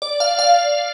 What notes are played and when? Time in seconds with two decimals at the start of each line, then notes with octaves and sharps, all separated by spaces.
0.02 D5
0.20 F5
0.39 F5